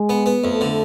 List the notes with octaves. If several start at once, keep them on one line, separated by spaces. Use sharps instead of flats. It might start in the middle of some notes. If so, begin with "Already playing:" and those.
Already playing: G#3
B3
B3
F2 A3
D3